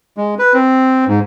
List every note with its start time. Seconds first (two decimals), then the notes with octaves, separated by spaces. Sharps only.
0.17 G#3
0.39 B4
0.54 C4
1.08 G#2